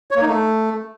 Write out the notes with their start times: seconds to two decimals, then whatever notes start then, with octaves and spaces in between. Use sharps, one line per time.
0.11 C#5
0.16 A#3
0.22 D#4
0.27 A3